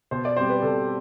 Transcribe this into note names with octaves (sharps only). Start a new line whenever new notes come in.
B2 C5
D5
G3 C4 G4 C5
B4
B2 A4